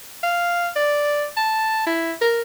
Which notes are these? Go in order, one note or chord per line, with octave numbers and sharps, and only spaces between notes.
F5
D5
A5
E4
A#4